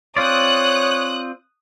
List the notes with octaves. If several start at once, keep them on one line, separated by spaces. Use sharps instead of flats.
C4 F4 C#5 D5 D#6 F#6